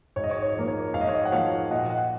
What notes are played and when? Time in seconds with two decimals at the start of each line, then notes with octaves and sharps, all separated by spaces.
0.16 G#2 C#5
0.24 D#5
0.31 C#5
0.42 C#5
0.56 F3 A#3
0.68 C#5
0.94 G#2 F5
1.01 D#5
1.08 C#5
1.15 D#5
1.25 F#5
1.32 F3 A#3 C#5 F5
1.70 A#2 D#5 F#5
1.90 D#5 F#5